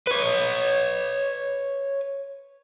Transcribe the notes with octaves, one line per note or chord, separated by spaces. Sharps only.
B4 C#5